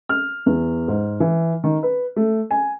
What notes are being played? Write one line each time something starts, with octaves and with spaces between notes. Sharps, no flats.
F6
E2
G#2
E3
D#3
B4
A3
G#5